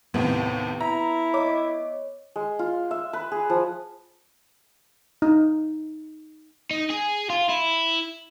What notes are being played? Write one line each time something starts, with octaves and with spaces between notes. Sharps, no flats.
D#2 A2 C3 B3
E4 A#5
C#5 D#5 D6
G#3
F4
E5
B4
G#4
F3
D#4
D#4
G#4
F4
E4